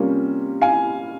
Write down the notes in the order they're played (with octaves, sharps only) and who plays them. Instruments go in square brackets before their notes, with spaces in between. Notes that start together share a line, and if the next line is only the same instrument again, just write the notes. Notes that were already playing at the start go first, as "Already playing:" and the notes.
Already playing: [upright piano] C3 G3 A#3 C#4 F4
F5 G#5